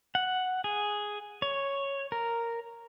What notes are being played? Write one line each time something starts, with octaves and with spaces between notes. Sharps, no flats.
F#5
G#4
C#5
A#4